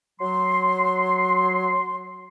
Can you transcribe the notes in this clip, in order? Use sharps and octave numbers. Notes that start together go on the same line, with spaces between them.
F#3 C6